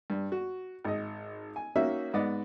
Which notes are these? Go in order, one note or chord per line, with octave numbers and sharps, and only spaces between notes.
G2
F#4
G#1 D#5
G#5
A#3 C#4 D#4 F#4 E5
G#2 B3 D5 D#5